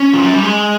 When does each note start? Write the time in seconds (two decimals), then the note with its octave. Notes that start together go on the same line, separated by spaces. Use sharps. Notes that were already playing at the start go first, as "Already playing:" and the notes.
Already playing: C#4
0.13 F3
0.23 F#3
0.33 G3
0.43 G#3